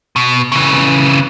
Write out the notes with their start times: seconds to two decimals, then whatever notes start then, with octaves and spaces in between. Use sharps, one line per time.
0.16 B2
0.52 C#3 E3